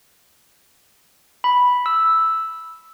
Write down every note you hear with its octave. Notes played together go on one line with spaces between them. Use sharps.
B5
E6